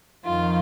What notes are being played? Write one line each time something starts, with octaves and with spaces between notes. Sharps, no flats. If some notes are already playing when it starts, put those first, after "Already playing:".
F2 D#3 F4